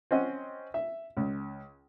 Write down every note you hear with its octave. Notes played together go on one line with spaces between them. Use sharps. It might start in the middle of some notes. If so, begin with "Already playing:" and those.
C4 C#4 D#5 F#5
E5
C#2